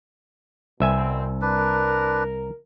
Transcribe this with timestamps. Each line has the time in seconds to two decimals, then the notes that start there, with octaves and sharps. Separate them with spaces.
0.80 C2 B2 C4 E5 G#5
1.42 D4 A#4 B4